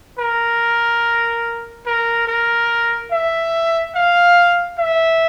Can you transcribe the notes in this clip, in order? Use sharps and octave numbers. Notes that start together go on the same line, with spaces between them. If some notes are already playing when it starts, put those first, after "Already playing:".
A#4
A#4
A#4
E5
F5
E5